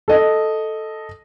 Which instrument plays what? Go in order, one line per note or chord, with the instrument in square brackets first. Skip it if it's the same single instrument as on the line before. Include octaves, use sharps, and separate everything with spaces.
[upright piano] A4 D#5